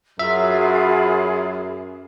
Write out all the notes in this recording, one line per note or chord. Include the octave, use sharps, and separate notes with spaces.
F#2 F#3 F4 G#4 E5 B5